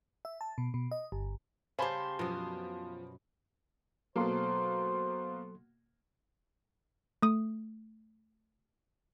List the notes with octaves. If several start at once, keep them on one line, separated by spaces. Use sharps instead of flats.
E5
A5
B2
B2
D#5
G1
C#3 G4 C5 F5 G#5 A5 B5 C6
F#2 B2 F3
B2 F#3 A#3 A4 C5 C6
A3 D#6